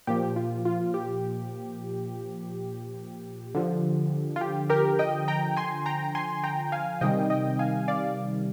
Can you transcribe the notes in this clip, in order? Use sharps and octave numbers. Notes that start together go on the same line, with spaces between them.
A#2 F3 G4
F4
F4
G4
D3 F3
F4
G4
G4 A#4
D#5 G5
G5 A#5
G#5 C6
G5 A#5
G#5 C6
G5 A#5
F5 G#5
C3 D#3 G3 D#5 G5
D#5 G5
F5 G#5
D5 F5